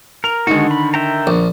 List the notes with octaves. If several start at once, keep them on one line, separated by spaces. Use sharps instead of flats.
A#4 F7
D3 D#3 G#3 F#4
B5
E5 G5 A#5
A#1